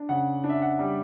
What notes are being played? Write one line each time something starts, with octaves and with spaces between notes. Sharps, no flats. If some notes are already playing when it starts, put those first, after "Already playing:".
Already playing: D4
C#3 F#5
D4
E5
F#5
G3